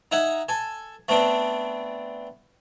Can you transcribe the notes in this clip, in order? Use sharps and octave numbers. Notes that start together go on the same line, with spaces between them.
D#4 E5 F#5 G#5
A4 G#5
A3 B3 C4 D4